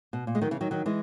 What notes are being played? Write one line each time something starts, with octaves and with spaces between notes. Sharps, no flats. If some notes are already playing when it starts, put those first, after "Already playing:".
B2
A#2
G#3
D#3 F#3
C#3 E3
D#3 F#3
D#3 F#3
E3 G#3